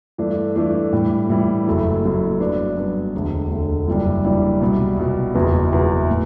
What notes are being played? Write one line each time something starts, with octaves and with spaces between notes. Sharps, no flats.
G2 E3 A3 D4
G2 E3 A3 D4
A2 E3 G3
A2 E3 G3
F#1 F#2 F#3 A3 E4
F#1 F#2 F#3 A3 E4
G2 F#3 B3 D4
G2 F#3 B3 D4
E1 D2 D3
E1 D2 D3
F#1 F#2 E3 G3 D4
F#1 F#2 E3 G3 D4
C2 B2 G3
C2 B2 G3
F#1 E2 B2 F#3 B3
F#1 E2 B2 F#3 B3
A2